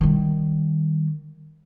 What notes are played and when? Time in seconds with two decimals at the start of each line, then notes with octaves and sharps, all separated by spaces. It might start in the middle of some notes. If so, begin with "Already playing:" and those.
0.01 D#3 G3